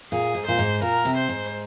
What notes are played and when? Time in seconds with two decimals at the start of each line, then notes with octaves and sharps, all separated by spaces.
0.12 A#2 G#4
0.35 G#2
0.46 A#2 C5
0.58 G#2
0.82 A#2 A#4
1.05 C3
1.17 C5
1.29 G#2